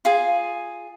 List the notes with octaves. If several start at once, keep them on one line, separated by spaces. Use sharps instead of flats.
F4 G#4 G#5